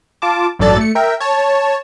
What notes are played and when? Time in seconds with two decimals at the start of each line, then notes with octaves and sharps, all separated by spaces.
0.22 F4 A5 D6
0.59 A1 G2 F#3 A4 D5 A6
0.78 A3 C#7
0.95 A#4 E5 G5
1.20 C#5 A5